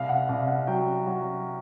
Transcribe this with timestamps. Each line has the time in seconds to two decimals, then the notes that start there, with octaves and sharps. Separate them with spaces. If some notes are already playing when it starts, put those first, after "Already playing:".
Already playing: C2 F5
0.09 F#5
0.28 C2 F5
0.48 F#5
0.67 F#3 G5
1.07 F#3